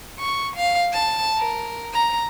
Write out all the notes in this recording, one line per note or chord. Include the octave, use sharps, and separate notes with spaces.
C#6
F5
A5
A#4
A#5